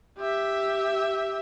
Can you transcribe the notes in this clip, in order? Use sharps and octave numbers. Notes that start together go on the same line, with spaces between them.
G4 E5